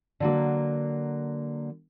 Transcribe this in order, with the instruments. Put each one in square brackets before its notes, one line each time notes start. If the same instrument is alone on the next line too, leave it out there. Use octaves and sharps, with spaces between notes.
[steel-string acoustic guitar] D3 F#3 A#3